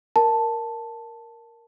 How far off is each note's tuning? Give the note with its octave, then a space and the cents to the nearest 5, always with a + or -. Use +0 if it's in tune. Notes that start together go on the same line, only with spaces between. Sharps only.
A#4 +0 A5 +0